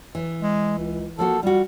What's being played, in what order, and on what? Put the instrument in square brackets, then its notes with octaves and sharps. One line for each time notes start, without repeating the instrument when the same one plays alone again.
[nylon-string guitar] E3
[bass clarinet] G#3
C#2
[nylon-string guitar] F3 A#3 F#4 [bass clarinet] A4
[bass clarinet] G3 [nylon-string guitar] F4 F#4